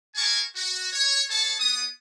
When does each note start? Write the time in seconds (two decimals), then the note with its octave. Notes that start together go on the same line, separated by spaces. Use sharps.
0.16 G#4 A#4 G#5 A5 C#6
0.55 F#4
0.92 C#5
1.29 G#4 A4 C#5 A5
1.59 B3 D#6